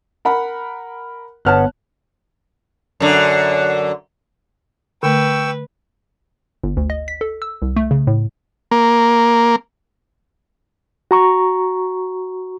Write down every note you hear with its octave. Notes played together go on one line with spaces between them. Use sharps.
A#4 F#5 B5
G1 B3 C#5 A5 F6 F#6
F#2 D3
D3 A3 B4 G5 C#6 E6
G1
D2
D#5
B6
A4
E6
C2
A3
C#3
A2
A#3
F#4 A#5 C#6